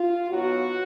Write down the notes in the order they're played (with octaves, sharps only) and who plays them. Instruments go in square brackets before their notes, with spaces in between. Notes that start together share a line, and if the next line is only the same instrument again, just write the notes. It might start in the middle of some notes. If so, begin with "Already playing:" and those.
Already playing: [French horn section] F4
B2 F#3 B3 D#4 F#4